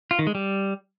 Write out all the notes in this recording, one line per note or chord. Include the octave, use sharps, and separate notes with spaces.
F4
D#3
G#3
G3